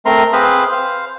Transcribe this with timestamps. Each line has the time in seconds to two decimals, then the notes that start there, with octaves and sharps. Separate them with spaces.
0.06 A3 C4 A#4 A#5 C6
0.33 C4 G#4 B4 C5 F5 B5
0.72 C5 F5